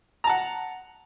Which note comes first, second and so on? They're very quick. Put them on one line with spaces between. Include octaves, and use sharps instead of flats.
A#5 A5 F#5